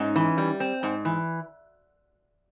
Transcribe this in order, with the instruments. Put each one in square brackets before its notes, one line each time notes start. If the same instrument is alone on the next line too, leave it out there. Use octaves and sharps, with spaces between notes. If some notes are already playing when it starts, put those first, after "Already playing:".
Already playing: [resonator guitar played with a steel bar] G#2 [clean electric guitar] C#4 D#4
[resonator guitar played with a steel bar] E3
G3
C4
G#2
E3